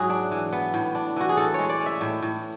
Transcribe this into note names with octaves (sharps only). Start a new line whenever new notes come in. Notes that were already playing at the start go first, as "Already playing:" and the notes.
Already playing: G#2 F#3 E4 F#4 G#4
D4
E3
B3
A2
D4
E3 F#4
G#4
A2 A4
G#3 C#5
D5
C#4
E5
A2
A2